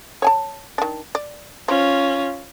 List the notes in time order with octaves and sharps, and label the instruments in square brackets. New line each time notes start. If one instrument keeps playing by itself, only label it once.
[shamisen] C#5 G#5 A5
D#3 D4
D5
[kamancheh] C#4 F4 [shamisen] C5